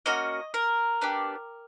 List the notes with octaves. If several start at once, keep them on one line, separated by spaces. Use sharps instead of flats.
A#3 C#4 F#4 D#5
A#4
B3 D4 G4